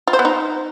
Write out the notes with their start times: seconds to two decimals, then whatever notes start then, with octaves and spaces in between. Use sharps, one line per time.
0.07 F4
0.13 C5
0.19 B3
0.25 D#4